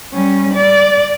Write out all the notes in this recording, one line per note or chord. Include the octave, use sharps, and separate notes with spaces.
G3 C#4
D5